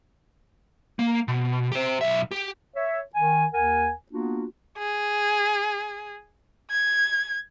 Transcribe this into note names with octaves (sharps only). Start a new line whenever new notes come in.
A#3
B2
G4 C5
B1 E5
G4
C#5 E5
D#3 G#5
D#2 A#4 F#5 G#5
A#3 B3 D4 F4 F#4
G#4
G#6